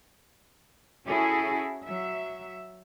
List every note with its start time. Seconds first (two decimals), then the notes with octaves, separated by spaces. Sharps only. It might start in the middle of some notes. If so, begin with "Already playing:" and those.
1.07 C#4 E4 F#4 G#4 A4
1.84 F#3 E5